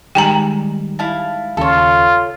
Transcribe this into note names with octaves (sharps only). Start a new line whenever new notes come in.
D#3 G3 G#3 G5 G#5 A#5
E4 F5 A5
D#2 C#3 F4 A4 C#5